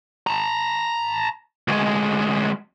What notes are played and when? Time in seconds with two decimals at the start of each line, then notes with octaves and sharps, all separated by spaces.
0.27 A5 A#5
1.68 D2 G#3